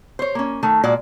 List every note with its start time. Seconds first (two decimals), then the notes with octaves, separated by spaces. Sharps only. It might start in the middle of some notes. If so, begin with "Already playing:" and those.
0.19 C5 C#5
0.35 A#3 C#4
0.63 D#3 A3
0.84 A#2 G#3 F#4 D5